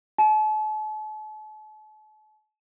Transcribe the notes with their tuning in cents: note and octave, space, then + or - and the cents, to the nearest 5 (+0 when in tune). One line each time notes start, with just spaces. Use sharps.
A5 -40